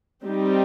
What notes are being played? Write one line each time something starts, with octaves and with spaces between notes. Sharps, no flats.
G3 C4 D#4 G4